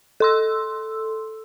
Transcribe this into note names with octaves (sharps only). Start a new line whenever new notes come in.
A4 C6 E6